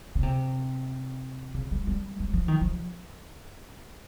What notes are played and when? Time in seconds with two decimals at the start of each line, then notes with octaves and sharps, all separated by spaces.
0.15 C#3
0.23 C3
1.54 C#3
1.71 G3
1.87 G3
2.20 G3
2.33 F3
2.48 D#3
2.61 F3